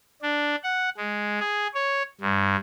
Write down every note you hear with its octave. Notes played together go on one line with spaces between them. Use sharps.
D4
F#5
G#3
G#4
C#5
G2